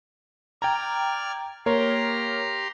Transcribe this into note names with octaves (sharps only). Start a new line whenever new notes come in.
D5 G5 A#5 F6 G#6
A#3 G4 A#4 C#5 A#5 C6